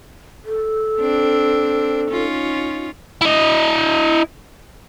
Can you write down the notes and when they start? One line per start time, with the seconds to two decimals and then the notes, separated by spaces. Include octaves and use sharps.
0.45 A4
1.00 C4 D4
2.10 C#4 D#4 F4
3.21 E4 D#5